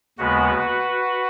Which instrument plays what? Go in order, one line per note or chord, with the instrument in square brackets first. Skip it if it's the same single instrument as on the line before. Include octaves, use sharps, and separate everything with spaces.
[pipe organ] D#2 C#3 G#3 B3 F#4 B4